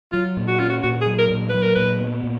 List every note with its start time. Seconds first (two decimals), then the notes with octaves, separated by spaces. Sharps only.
0.12 F#3 F4
0.37 A#2
0.48 F#4
0.59 C#4 F4
0.70 F#4
0.83 A#2 F#4
1.01 G#4
1.07 F#3
1.19 A#4
1.31 A#2
1.49 B4
1.54 F#3
1.62 A#4
1.75 A#2 B4
2.01 B3
2.24 A#2